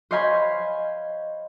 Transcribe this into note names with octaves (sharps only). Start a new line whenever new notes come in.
C5 C#5 D#5 F5 G#5 B5